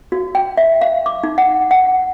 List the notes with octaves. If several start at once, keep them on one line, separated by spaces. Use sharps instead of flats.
F#4
G5
E5
F5
D6
D#4
F#5
F#5